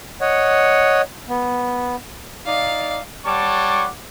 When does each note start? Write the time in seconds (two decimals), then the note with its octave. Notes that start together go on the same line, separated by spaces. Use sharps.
0.21 C#5 D#5 F#5
1.29 B3
2.46 D#4 D5 F5
3.25 G3 C#5 F#5 A5 C#6 D6